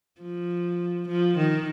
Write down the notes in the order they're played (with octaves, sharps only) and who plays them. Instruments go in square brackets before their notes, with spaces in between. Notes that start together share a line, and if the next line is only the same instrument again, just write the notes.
[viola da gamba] F3
F3
D#3